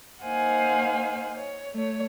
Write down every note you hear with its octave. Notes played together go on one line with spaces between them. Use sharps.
A#3 D#4 C5 F5 F#5 G#5
C#5
A3 C#5